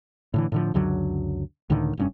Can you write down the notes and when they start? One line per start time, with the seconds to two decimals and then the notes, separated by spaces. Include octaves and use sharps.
0.34 A2 D3 E3
0.52 A2 D3 F3
0.74 C#2 F#2 D3 F#3
1.70 C#2 A2 D3 D#3
1.97 F1 G2 C#4